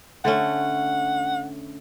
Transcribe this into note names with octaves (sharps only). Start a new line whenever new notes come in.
D3 A3 C#4 F#5